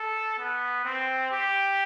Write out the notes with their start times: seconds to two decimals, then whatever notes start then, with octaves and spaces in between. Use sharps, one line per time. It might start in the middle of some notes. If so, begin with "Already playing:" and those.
Already playing: A4
0.38 B3
0.85 C4
1.31 G4